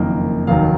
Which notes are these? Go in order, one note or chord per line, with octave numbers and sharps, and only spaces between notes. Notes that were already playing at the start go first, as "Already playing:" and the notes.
Already playing: F#1 F2 D#3 A#3
F1 D#2 D#3 F#3 F5